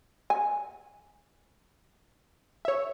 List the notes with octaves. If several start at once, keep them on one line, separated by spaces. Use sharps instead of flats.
G#5
C#5 E5